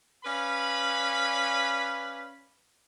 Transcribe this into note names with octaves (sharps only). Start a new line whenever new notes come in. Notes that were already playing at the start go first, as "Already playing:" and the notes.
C#4 B4 D5 F5 B5